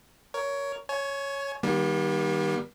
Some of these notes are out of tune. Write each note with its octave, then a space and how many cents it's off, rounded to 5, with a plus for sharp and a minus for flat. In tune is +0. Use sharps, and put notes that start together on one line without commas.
A#4 +0 C#5 +15
C#5 +0 G#5 +35
D#3 +0 G3 +0 A#3 +45